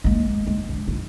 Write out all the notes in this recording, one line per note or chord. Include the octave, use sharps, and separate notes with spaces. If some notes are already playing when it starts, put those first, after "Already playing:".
G#3 A#3
G#3
C#4 D4
F4